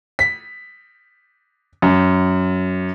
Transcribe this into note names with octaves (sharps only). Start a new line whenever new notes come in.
B6
F#2